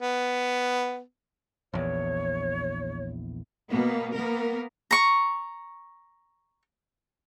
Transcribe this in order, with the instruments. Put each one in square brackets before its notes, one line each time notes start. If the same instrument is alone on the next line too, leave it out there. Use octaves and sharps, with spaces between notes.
[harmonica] B3
[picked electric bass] A#1 E2 [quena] C#5
[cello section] B2 A#3 B3
A#3 B3 A#4
[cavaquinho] A#5 C#6